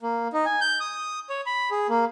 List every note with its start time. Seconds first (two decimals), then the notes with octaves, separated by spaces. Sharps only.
0.02 A#3
0.33 D#4
0.45 G#5
0.61 G6
0.80 D#6
1.30 C#5
1.46 B5
1.71 G#4
1.89 A#3